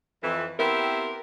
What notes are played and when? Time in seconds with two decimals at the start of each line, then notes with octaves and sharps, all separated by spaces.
0.22 F2 E3
0.59 B3 C4 E4 G4 A#4